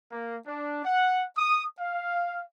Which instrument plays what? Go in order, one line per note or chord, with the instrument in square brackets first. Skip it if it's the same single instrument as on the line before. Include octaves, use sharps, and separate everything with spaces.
[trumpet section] A#3
D4
F#5
D#6
F5